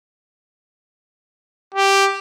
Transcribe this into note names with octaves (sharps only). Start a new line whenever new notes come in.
G4